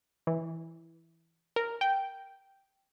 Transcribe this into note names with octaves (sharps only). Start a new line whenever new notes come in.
E3
A#4
G5